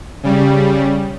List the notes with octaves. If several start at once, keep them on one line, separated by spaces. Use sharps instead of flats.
C#3 G3